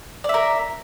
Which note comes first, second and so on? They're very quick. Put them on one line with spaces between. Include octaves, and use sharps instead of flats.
D5 E5 A#4